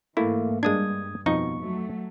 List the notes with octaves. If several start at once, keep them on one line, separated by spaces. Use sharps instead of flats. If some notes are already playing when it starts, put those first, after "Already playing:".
G#2 E3 A3 A#3 E4
G2 G#3 A#3 D4 D#6 G#6
F2 B2 F3 D#4 C#6
F#3 A3